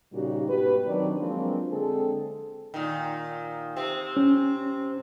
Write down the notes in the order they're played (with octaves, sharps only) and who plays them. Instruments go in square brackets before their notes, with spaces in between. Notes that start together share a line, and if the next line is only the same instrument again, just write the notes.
[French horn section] A#2 C#3 G3 D#4 F#4 G4
G#2 B2 G4 B4
D#3 F#3 C4 D4 D#4 D5
F3 F#3 G#3 A#3 C4 D4
D3 G#3 C4 G#4 A4
[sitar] A#2 D#3
C3 C4
[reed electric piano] C#4